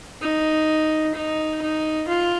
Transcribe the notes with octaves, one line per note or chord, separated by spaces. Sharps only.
D#4
D#4
D#4
F4